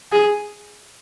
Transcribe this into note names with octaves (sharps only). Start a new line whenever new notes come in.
G#4